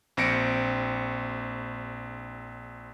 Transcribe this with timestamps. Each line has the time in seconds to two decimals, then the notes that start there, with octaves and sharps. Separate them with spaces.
0.17 A#1 C4 A#6 C#7 D7